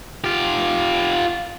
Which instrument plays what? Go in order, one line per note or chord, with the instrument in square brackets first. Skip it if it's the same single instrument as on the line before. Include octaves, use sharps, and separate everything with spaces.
[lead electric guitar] F4 G4